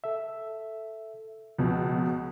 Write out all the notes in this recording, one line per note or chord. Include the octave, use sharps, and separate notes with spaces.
A4 E5
C#2 B2 F3